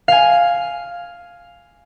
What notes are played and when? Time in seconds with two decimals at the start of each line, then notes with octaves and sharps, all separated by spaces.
0.08 F5 G#5